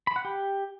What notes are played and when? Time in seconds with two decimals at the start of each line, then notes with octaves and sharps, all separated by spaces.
0.07 B5
0.16 F#5
0.25 G4